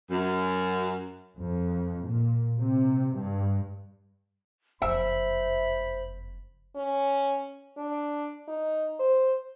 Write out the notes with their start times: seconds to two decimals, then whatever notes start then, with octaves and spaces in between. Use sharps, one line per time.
0.11 F#2
1.38 F2
2.06 A#2
2.60 C3
3.17 G2
4.82 F#1 F2 C5 E5 B5
6.76 C#4
7.77 D4
8.48 D#4
9.00 C5